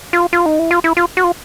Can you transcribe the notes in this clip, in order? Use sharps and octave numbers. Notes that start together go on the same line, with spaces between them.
F4
F4
D#4
E4
F4
E4
F4
F#4
F4